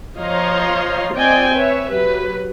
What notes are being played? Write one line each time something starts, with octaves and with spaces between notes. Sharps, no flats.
F3 C#5 D#5 F5 A#5 C6
C4 F4 D5 D#5 G5 G#5
B4 C#5 E5
F#3 G4 B4